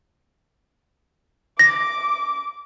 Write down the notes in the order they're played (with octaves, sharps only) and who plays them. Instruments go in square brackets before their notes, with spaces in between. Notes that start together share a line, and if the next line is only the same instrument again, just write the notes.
[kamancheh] D6 [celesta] A#6